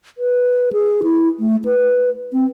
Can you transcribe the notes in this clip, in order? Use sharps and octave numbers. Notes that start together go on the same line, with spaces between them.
B4
G#4
E4
A3
B4
C4